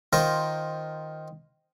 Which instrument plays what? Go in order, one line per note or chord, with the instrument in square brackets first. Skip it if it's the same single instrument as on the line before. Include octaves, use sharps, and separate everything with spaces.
[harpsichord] D#3 F4 A#4 C5